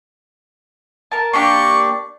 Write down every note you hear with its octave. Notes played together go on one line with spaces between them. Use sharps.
A#4 A5
A#3 D4 G4 D5 C#6